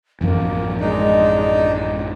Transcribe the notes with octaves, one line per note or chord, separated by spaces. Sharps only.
A1 F#2 F3 A#3
G#3 D4 D#4